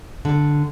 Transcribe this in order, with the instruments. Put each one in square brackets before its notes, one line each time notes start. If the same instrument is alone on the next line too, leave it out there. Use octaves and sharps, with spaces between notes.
[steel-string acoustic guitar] D3